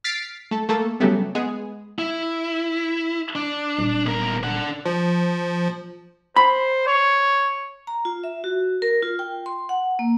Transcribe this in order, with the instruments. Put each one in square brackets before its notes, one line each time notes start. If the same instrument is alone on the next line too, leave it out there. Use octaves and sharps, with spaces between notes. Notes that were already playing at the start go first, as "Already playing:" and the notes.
[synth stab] F6 A6 B6 C7 D7
A3 A4
A3 A#3 A4
C#3 F#3 G3 A3 B3
G#3 B3 G#4
[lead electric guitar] E4
D4
[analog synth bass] D#1
[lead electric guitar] B1 A#4
D4 F#5
[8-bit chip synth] F3
[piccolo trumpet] C5 [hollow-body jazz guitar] B5
[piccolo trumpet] C#5
[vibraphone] A#5
F4
E5
F#4
A#4
F4
G5
C6
F#5
A#3